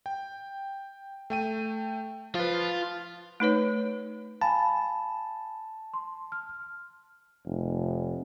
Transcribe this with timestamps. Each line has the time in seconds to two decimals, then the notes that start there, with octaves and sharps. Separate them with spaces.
0.06 G5
1.30 A3 G5 D#7
2.35 F3 F4 B4
3.40 A3 D#4 B4 C#5
4.41 F5 G#5 A5 B5
5.94 C6
6.32 F6
7.45 F1